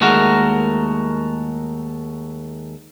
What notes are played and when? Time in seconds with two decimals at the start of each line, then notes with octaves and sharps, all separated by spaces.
0.01 D#2 G#3 A3 F#4 A#4